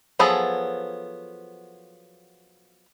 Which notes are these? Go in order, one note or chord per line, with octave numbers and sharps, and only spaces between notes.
F3 F#3 B3 G#4 A4